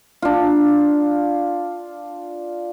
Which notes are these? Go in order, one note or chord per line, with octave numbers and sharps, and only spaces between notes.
D4 F4